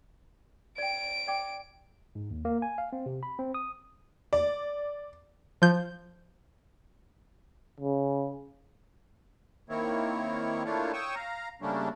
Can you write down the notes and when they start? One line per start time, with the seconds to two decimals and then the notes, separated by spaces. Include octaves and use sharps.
0.78 D5 G5 D7
1.27 D5 G5 D6
2.15 G#2
2.31 D#2
2.45 A#3
2.62 G#5
2.78 F5
2.93 C4
3.06 C3
3.23 B5
3.39 C4
3.54 D#6
4.33 D5
5.62 F3 G6
7.80 C#3
9.69 D#3 A#3 C4 E4 C#5
10.65 A3 A#3 D4 E4 F4 C#5
10.93 C#5 G5 C#6 D#6 E6
11.15 F5 A#5
11.62 C#3 G3 A3 A#3 C#4 D4